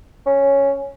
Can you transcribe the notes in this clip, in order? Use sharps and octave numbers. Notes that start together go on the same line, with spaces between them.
C#4